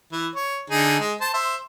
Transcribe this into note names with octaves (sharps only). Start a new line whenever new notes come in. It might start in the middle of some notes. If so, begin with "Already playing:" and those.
E3
C#5
D3 D#4 G#4
G#3
C5 A5
C5 E5